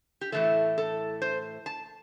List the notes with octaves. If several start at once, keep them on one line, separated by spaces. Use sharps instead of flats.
G4
A2 E3 A3 A4
A4
C5
A5